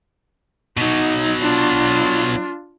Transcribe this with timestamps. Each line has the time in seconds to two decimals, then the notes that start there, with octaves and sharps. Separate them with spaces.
0.77 B2 F#3 D#4
1.41 D4 F4